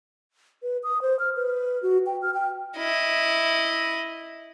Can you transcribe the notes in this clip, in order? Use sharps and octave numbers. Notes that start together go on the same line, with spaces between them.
B4
D#6
C5
F6
B4
F#4
G5
F6
G5
E4 D#5